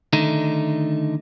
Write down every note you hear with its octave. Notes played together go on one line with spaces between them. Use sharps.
D3 D#3 A3 D#4